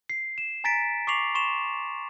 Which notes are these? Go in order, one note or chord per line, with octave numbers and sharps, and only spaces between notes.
C7
E7
G#5 A#5 A6 B6 D7
C#6 D6 C7 F7 F#7
C6 C#6 E7 F7